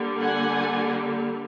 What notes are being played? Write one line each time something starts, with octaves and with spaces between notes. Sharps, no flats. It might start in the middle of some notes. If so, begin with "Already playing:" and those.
Already playing: D3 G3 A#3
F#5 G#5